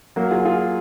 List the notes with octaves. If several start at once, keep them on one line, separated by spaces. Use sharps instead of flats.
F#3 A#3
F4 G#4
F4 G#4